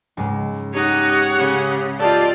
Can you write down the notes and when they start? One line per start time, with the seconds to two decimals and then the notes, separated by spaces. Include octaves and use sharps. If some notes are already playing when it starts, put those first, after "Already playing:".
0.17 C#2 G#2 G#3
0.74 D#4 G4 C#5 F#5
1.38 C#3
2.00 F4 G4 A4 D5 D#5 A5